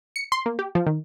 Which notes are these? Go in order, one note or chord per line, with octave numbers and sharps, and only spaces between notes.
C#7
C6
A#3
G4
F3
D#3